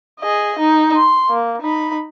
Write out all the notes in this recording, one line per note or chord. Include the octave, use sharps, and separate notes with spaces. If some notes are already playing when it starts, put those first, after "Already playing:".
G#4 D#5
D#4
C6
A#3
D#4 B5